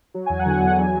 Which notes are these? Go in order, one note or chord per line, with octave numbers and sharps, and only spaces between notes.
F#3
E2 G#5
F#5
D3
G#5
E2
F#3